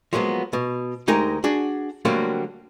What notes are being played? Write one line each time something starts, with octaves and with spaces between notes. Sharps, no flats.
F3 F#3 G#3 A#3 B3
B2
D2 G#3 D#4 G4 A#4 G#5
D4 F#4 G#4
D3 F#3 G3 A3 A#3 C4